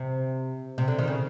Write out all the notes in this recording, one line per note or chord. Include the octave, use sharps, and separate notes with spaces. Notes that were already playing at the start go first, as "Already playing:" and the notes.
Already playing: C3
C3
D3
D#3
C#3